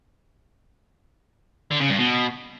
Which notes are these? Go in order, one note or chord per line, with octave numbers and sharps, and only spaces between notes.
D3
C#3
G2
B2